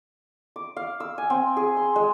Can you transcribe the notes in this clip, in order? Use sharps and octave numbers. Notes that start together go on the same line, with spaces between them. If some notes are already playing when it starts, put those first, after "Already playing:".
D6
F5
E6
G#5
C4
G#4
C6
G#3